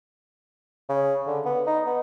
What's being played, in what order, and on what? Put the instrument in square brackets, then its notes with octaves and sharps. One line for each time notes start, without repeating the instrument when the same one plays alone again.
[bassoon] C#3
D3
B3
D#4
B3